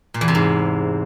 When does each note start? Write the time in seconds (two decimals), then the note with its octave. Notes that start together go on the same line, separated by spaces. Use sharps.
0.14 A#2
0.21 E2
0.28 C3
0.35 G#2